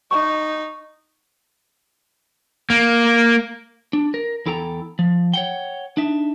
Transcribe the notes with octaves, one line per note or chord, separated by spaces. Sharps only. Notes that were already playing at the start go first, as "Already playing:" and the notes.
D#4 C#6
A#3
D4
A#4
E2 E4 A4 G5 A#5
F3
C#5 F#5 G5
D4 D#4 E5